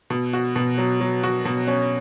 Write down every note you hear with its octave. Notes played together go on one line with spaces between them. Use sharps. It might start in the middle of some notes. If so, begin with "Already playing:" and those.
B2
F#4
B2
F#3
F#3
F#4
B2
C#4